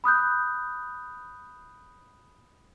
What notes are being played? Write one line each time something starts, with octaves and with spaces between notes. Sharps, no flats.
B5 D#6 F#6 G6